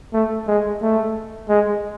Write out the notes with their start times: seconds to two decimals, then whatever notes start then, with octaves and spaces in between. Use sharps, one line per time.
0.13 A3
0.47 G#3
0.81 A3
1.49 G#3